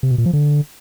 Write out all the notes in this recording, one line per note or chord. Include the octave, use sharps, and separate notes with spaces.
C3
B2
A#2
F3
D3